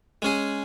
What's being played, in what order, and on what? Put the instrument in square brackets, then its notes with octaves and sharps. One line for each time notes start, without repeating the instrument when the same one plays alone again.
[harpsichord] G#3 C#4 G#4